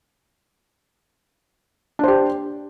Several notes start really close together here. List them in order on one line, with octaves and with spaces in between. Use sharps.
D4 C5 G4